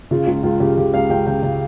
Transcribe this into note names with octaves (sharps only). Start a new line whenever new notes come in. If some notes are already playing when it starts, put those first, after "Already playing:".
C#3 F4
C#2 F4
C#2 F4
C#3 G4
C#3 G4
C#2 F5
C#2 G5
C#3 G5
C#3